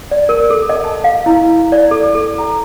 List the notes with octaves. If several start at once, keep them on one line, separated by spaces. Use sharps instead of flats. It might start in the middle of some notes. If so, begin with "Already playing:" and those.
D5
A#4
A4
D#5
A5
F5
E4
D5
A4
A4
A#5